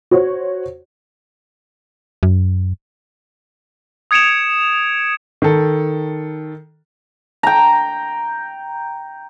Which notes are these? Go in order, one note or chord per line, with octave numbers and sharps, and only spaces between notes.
F#4 C5 C#5
F#2
D#6 G#6 C#7 D7 E7 F7
D#3 A4
G5 A#5